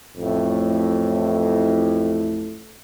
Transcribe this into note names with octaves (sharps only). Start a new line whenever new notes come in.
A1 F2 A2